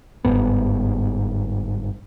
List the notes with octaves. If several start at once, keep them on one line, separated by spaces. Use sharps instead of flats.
G1 D#2 G#2 B3